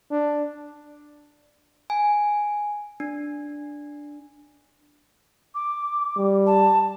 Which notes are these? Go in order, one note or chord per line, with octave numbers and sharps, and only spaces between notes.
D4
G#5
D4
D6
G3
A5